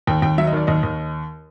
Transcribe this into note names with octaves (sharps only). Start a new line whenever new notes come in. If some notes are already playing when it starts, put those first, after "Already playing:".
D#2 G5
D#2 G5
F#3 E5
D#5
D#3 D5
D#2 D#5
D#2